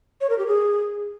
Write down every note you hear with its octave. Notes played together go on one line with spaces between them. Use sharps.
C#5
A#4
G4
G#4